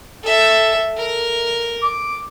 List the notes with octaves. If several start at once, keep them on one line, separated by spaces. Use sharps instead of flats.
A4 E5
A#4
D6